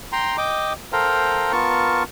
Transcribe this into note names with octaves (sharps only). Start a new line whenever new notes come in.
G5 A#5 C6
D#5 G5 D6
A4 A#4 C5 F5 G5 A#5
B3 F4 A#4 A5 C#6